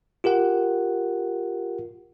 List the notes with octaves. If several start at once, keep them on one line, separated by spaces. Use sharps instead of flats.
F4 G4 A#4 F#5